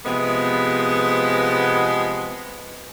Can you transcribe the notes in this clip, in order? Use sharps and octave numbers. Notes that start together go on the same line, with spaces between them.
C3 F3 G#3 B3